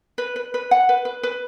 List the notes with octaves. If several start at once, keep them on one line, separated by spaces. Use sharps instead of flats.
B4
B4
B4
F#5
B4
B4
B4